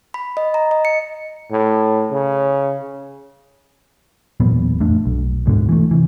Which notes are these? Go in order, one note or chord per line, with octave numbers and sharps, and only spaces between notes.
B5
D#5
A#5
D#5
C#7
A2
C#3
E1 A#2 F#3 B3
A1 F2 A3 D4
B1
D2 G#2 B2 D3
E3 A3
C3 E3